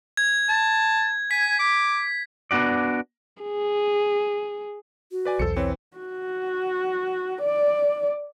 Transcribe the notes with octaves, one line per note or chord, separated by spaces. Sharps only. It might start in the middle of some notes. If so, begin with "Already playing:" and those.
G#6
A5
G#5 B6
D6
B3 D4 F#4 D5
G#4
F#4
B4 D5 G#5
B1 E2 A4 C5 C#7
E3 C4 B4 C#5
F#4
D5